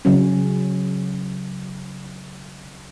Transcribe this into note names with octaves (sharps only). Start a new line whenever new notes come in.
C#3 F#3 C#4